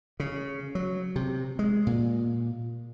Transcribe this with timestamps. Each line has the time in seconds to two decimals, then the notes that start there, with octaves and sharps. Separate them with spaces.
0.20 C#3
0.75 F#3
1.16 C3
1.59 G#3
1.87 A#2